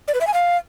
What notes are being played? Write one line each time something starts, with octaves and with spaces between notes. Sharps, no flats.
D5
B4
E5
G#5
F5